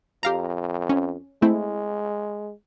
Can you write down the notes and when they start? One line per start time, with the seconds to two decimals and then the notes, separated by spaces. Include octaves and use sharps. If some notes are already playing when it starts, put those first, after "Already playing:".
0.23 F2 G4 F5 A#5
0.89 C#4
1.42 G#3 A3 C4 E4